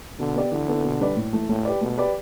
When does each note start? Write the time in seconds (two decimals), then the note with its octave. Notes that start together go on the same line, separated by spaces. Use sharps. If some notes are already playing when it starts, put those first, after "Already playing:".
0.19 B2 D3
0.36 B3 G4 D5
0.52 D3 E3
0.68 B3 E4 A4
0.84 B2
1.00 G3 D4 B4 D5
1.16 A2
1.33 E3 A3
1.49 A2 A3
1.65 G4 B4 D5
1.81 B2 A3
1.98 G4 B4 D5